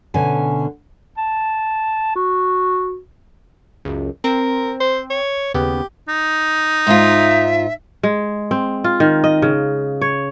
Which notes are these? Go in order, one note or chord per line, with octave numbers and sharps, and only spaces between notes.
B2 D3 C#4 G#5
A5
F#4
C#2 F#2
C4 A#4
C5
C#5
D#2 C#3 B3 G4
D#4
G#2 F4 E5
G#3
C4
F4
D#3
D#5
C#3
C#5